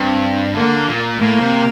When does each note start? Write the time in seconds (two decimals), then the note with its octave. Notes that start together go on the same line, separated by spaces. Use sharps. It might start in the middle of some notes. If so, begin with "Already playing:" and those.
Already playing: G2 C4
0.55 D3 A#3
0.88 A#2
1.19 A2 A#3
1.40 C3